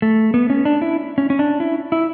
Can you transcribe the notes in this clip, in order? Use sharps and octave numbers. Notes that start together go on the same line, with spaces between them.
A3
B3
C#4
D4
E4
C#4
C#4
D4
E4
E4